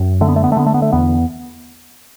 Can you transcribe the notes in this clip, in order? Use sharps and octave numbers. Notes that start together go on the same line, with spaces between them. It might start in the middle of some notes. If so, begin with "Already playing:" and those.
Already playing: F#2
D3 A3
B3
A3
B3
A3
D3 B3
A3
B3
A3
E2 B3